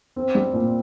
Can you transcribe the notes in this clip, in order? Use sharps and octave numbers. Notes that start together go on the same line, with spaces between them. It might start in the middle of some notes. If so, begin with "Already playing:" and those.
C4
G3
A#2